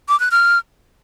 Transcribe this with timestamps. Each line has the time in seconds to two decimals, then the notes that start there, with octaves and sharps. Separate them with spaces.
0.09 D6
0.20 F#6
0.31 F6